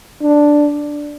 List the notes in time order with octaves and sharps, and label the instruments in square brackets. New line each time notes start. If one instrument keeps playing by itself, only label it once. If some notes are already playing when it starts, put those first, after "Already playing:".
[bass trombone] D4